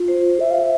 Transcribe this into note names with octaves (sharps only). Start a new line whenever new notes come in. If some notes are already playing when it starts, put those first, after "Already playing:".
Already playing: F4
C5
E5
F5
E5